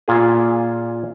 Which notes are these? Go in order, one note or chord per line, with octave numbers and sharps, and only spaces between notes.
A#2 F4 G#4